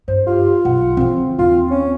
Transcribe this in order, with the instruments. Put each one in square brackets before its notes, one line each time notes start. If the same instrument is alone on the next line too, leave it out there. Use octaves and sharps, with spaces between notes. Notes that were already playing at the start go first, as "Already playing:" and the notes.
[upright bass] G2 [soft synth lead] C5
[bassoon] F4 [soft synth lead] G4
[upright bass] B1 [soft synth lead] F#5
[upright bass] C#3 E3 [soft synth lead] C4
[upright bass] D#2 D#4 [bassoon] F4
[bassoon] C#4